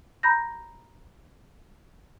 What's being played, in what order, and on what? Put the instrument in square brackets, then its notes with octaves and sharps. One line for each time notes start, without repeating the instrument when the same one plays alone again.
[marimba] A#5 B5 G6 A#6